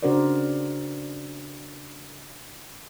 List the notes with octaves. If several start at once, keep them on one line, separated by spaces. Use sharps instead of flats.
C#3 D4 F#4 A#4 C5 D5